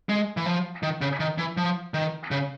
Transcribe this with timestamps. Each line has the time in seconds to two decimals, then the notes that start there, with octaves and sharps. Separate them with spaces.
0.09 G#3
0.37 E3
0.46 F3
0.83 D#3
1.01 C#3
1.20 D#3
1.38 E3
1.57 F3
1.94 D#3
2.31 C#3